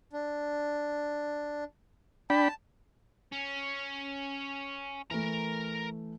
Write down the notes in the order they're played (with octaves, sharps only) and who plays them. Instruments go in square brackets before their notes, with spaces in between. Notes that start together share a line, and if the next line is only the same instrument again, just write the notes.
[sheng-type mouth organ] D4
[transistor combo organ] D4 G5 B5 [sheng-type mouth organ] A5
[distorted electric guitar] C#4
[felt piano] E3 A3 [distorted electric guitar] A#4 A#5